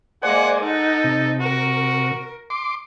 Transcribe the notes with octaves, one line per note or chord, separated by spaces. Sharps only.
G#3 A#3 C5 D5 F#5 G#5
D#4 A4 F#5
C3
F#4 A#4
C6 D6